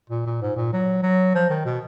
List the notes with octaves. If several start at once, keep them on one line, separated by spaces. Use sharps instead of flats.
A#2
A#2
G#2
A#2
F#3
F#3
F3
D#3
B2